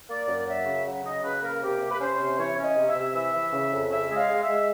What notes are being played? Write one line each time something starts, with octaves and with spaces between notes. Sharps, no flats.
A#3 D5
F#2
F#3 E5
C#3
F#3
C#3 D#5
C#3 B4
A#3 A#4
C3 G4
C3
B4
C#4 C5
C3
E3 C#5
C#4
D#5
C3
E5
C3
E3 E5
E3
C#3
F2
C#3 E5
G#3
F5
G#3
E5
G#3